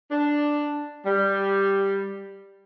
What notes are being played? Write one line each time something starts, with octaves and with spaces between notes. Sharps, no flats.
D4
G3